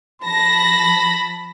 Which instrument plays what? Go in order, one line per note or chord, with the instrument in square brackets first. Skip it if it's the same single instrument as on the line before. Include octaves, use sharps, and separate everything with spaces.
[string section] F3 A5 A#6 [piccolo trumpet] B5